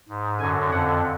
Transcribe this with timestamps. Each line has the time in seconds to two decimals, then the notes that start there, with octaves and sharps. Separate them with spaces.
0.09 G#2
0.40 F#2 D3 G#5
0.71 F2 D3 F#5